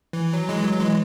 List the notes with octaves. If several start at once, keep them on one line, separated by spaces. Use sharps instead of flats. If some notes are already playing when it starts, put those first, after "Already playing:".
E3
F#3
E3 G#3
F#3
E3 G#3